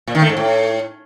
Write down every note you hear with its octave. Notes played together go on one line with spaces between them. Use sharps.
A#2
D#3
A3
G#2
A2